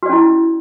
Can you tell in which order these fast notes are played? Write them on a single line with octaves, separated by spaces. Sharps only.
F#4 D5 C#4 E4